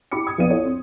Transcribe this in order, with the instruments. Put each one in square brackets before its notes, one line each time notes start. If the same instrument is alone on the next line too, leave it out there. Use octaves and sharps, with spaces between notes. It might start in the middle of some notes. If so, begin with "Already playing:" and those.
[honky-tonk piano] E4 G4 B5 D6 C#7
D#6 G#6
A#1 F2 B3 D5 F5 D#7
E4 A4 C#5
C4